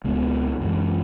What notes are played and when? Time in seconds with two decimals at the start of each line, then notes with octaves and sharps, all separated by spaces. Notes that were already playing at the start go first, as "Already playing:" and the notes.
0.04 C#2 B2 G#3 B3
0.61 F#2 E3 G#3